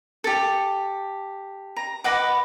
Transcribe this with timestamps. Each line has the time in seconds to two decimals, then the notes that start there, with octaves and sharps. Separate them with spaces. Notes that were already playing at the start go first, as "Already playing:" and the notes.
0.24 G4 A4
1.76 A#5
2.04 B4 D#5 F#5 D6